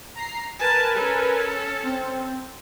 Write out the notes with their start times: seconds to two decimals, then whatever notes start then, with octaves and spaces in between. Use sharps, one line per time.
0.15 A#5 C7
0.59 A#4 B4 G#5 A5
0.96 C#4 A4
1.84 C4